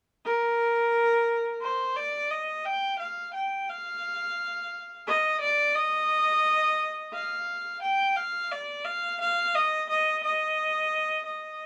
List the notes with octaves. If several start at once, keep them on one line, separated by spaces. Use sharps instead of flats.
A#4
C5
D5
D#5
G5
F5
G5
F5
D#5
D5
D#5
F5
G5
F5
D5
F5
F5
D#5
D#5
D#5
D#5